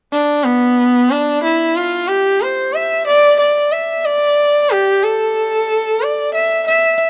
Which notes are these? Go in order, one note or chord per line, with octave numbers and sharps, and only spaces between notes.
D4
B3
D4
E4
F4
G4
C5
E5
D5
D5
E5
D5
G4
A4
D5
E5
E5